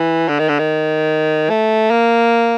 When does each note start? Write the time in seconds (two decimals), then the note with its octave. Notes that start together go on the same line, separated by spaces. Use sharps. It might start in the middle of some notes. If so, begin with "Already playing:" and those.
Already playing: E3
0.29 D3
0.39 D#3
0.49 D3
0.59 D#3
1.49 A3
1.91 A#3